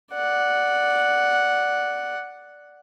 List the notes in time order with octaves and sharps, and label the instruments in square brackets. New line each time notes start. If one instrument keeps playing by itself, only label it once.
[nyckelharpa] D5 F#5